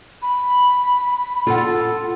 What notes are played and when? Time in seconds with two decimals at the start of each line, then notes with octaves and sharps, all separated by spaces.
0.22 B5
1.47 F4 A4 F#5